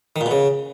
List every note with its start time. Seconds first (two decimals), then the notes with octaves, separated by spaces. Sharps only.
0.16 D#3
0.21 A#2
0.26 B2
0.31 C#3